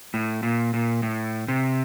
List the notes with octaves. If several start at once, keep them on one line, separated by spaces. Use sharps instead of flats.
A2
A#2
A#2
A2
C3